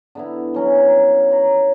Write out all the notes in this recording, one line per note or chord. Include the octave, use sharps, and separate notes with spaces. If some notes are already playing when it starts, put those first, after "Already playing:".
D3 B3 E4
F#3 C#4 E4
D#4
A#5 B5